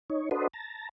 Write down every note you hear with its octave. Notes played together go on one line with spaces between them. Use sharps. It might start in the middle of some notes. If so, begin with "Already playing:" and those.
D#4 C#5
D4 F#4 A4 B4 C5 D#5
A5 A#5